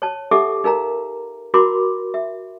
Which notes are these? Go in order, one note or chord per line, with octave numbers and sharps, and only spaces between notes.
C#5 A5
D#4 G4 A4 E5 F#5 D6
D#4 A#4 F5 A#5
E4 F#4 A#4 B5 C6 D6
E5